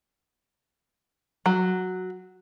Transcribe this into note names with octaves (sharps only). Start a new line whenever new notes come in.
F#3